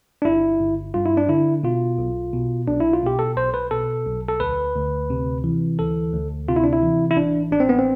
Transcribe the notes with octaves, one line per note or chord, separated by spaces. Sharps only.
D4
G1 E4
G1
G2 F4
E4
D4
D3 E4
B2 F4
B1
B2
B1 D4
E4
F4
B2 G4
A4
B1 C5
B4
B2 A4
B1
A4
D2 B4
D2
C3
E3
D2 A4
D2
C3 F4
E4
D4
E4
E3
E4
A1 D4
A1 D4
C4
B3
C4